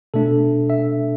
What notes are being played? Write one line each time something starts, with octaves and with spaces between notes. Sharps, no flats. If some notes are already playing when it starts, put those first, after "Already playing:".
B2 A3 D4 A4
E5